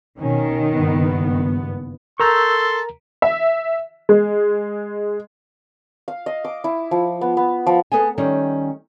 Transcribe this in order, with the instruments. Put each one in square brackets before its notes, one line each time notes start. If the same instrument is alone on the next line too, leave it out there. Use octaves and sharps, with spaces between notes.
[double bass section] B2 C#4 [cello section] D#3
[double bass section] F#1 G2 B3
[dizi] A4 [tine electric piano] A#4 A#5 [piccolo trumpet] C6 [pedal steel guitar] C#6 E6 G6
[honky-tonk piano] E5
G#3
[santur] F5
D#5
D6
E4
F3
B3
B3
F3
[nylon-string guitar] B3 G#4 A4 G#5
D#3 G3 C#4